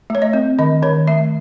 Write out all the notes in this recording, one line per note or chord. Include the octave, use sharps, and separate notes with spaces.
A3 C#5
D#5
C4
D#3 D#5
D#3 C#5
A3 E5